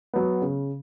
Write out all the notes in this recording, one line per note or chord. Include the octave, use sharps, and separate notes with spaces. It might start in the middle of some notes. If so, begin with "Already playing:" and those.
F#3 B3
C#3